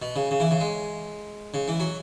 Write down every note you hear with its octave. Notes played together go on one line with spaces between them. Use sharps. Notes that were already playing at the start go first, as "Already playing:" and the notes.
B2
C#3
C#3
E3
C#3
G#3
C#3
E3
F#3